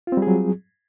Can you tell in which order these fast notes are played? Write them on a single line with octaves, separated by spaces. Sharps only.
F4 C4 G3 G#4 F#3